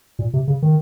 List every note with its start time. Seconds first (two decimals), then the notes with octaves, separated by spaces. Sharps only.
0.19 A#2
0.34 C3
0.48 C#3
0.62 D#3